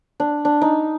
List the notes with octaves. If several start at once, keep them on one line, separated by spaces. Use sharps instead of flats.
D4
D4
D#4